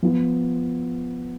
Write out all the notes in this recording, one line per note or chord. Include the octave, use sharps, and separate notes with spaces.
F3 B3 F4